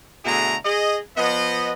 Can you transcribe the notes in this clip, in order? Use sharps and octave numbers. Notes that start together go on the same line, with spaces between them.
B2 D3 A3 E4 G#4 A#5
G#4 D#5
F3 B3 D#5